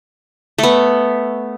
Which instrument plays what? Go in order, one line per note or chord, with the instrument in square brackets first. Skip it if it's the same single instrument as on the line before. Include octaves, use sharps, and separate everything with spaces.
[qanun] A3 B3